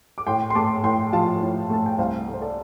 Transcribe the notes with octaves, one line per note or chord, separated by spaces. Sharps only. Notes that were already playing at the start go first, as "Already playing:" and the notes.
D6
A2 G5 C6
C6
A3 A5 D6
A2 G5 C6
F3 F5 A5
A2
A3 A5
G5
C2 C5 F5
A3
C5
A4 D5